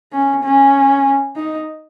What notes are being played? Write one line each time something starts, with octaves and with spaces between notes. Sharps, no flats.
C#4
C#4
D#4